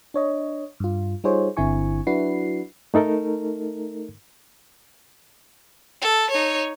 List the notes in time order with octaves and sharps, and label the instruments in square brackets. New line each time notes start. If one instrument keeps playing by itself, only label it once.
[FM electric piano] D4 C#5 D#5
G2 F4
G3 D#4 F4 G#4 C5 C#5
G1 D3 C4 E4 G#5 C#6
F#3 D4 E4 F#4 B4 C7
[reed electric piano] A3 D#4 A4 A#4
[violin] A4
D#4 C#5